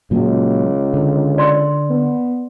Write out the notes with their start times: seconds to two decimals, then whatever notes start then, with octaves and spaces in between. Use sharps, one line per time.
0.11 C#2 A#2 F#3
0.94 D3
1.38 D5 C6
1.90 B3